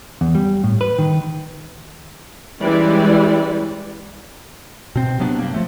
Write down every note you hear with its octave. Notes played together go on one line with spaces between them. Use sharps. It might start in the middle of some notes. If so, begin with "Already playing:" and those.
E2
G3
A2
B4
D#3
E3 G3 G#3 C#4 D5
B2 C4
C3 F#3 B3 D4
G2 A#3
F3 A3